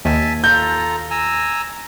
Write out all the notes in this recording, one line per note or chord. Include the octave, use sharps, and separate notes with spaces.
D#2 E5 G#5 A5
F4 A4 A#5 G6
G#5 A#5 E6